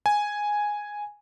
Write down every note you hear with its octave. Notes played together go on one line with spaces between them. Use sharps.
G#5